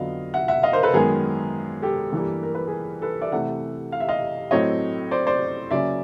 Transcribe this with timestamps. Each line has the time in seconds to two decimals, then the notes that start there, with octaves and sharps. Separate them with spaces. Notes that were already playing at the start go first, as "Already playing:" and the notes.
Already playing: F2 D3 F#3 B3 D#5 F5
0.34 E5 F#5
0.48 E5 F#5
0.63 D#5 F5
0.73 A#4 C5
0.83 A4 B4
0.94 F#2 D#3 G#3 B3 G#4 A#4
1.82 G4 A4
2.13 G2 E3 G3 A#3
2.43 A#4
2.55 B4
2.67 G#4 A#4
3.02 A4 B4
3.22 D5 E5
3.32 C3 E3 A3 E5 F#5
3.92 F5
4.00 E5
4.09 D#5 F5
4.51 A2 F#3 A3 C4 C#5 D#5
5.11 C5 D5
5.27 C5 D5
5.71 C#3 F#3 A#3 C#4 D5 E5